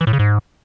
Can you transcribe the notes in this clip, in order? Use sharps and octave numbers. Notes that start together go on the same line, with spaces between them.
E3
A2
C#3
G#2